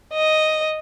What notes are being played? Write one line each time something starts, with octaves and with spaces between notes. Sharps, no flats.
D#5